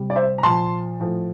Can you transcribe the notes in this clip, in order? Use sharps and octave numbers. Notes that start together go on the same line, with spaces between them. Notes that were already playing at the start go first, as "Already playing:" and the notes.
Already playing: C3 G3
D5
C5 E5
A#5
A#2 F3 A5 C6
A2 F3